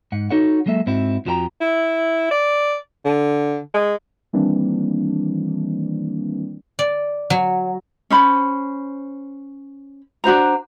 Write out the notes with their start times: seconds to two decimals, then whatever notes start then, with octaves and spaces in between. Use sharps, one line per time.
0.12 G#2 F#5
0.30 D#4 F#4 A4 C#5 F#5
0.66 F#3 G#3 A#3 A4 E5
0.87 G#2 C4 E4 F#4
1.26 F2 F3 F#4 A4 G5 A#5
1.61 E4
2.31 D5
3.05 D3
3.74 G#3
4.33 D#3 E3 G3 A#3 C4 D4
6.79 D5
7.30 F#3
8.10 C#4 C5 B5
10.24 D4 F#4 C5 A#5